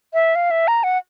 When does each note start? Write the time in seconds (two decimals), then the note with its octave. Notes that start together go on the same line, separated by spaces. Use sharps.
0.14 E5
0.35 F5
0.51 E5
0.68 A#5
0.84 F#5